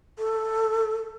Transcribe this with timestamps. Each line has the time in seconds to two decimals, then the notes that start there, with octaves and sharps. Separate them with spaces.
0.19 A4